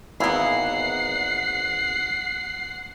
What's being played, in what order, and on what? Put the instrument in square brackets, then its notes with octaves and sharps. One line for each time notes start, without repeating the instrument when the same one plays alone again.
[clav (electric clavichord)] G#1 E2 E4 [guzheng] A#3 B3 [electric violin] F#5 C7